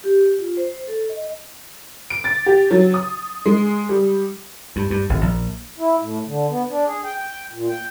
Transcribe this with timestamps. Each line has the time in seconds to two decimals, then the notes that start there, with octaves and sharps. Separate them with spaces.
0.04 G4
0.39 F4
0.57 C5
0.87 A4
1.09 D#5
2.10 D7
2.24 A6
2.46 G4
2.71 F#3
2.94 D#6
3.46 G#3
3.89 G3
4.76 G2
4.90 G2
5.09 G#1
5.21 A#1
5.79 E4
5.99 A2
6.26 D3
6.49 B3
6.69 D4
6.86 G#4
7.04 G5
7.18 G5
7.51 A#2
7.69 G5